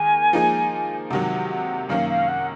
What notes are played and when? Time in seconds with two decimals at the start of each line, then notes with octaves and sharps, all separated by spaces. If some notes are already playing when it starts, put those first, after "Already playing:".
Already playing: D#3 A#3 G#4 G#5
0.33 F3 A#3 D#4 G#4
1.10 C3 D#3 F#3 F#5
1.50 F#5
1.89 F#2 D#3 A#3 C#4 F5
2.09 F5
2.28 F#5